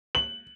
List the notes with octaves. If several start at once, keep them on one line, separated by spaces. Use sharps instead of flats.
F#7